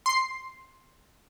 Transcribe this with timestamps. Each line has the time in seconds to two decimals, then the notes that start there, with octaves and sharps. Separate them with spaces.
0.06 C6 C7